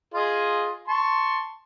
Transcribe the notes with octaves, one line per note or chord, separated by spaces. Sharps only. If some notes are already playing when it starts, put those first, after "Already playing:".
F4 G#4 D#5
A5 C6 C#6